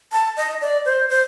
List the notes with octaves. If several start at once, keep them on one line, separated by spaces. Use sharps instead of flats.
A5
D#5
D5
C5
C5